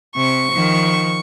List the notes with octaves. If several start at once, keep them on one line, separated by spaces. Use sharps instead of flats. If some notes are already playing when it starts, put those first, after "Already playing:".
C3 C#6
D#3 F3